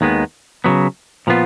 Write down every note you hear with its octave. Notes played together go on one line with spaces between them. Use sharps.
D#2 D#3 G#3 B3
C#3 F#3 B3
A#2 F3 B3 F4